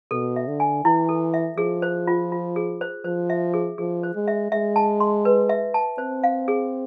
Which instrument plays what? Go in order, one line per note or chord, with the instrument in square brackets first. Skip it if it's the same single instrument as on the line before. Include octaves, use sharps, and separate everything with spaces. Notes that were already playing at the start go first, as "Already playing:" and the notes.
[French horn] B2 [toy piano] A4
[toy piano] E5
[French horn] D3
[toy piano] G#5
[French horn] E3 [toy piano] E4
[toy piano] A4
E5
[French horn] F3 [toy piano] G#4
[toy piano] C5
F4
F4
G#4
C5
[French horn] F3 [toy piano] C5
[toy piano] E5
G#4
[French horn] F3 [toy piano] G#4
[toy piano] C5
[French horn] G#3
[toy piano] E5
[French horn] G#3 [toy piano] E5
[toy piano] A5
C6
B4
E5
A5
[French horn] C4 [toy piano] C5
[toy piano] F5
G#4